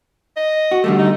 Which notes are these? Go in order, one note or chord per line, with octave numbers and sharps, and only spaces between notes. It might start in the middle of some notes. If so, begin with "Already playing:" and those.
D#5
F#4
D3 G3 A3
D#4